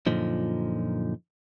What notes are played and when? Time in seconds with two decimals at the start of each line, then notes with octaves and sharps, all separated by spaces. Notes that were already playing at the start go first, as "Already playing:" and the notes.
0.06 F#2 A#2 D3 F3 D#4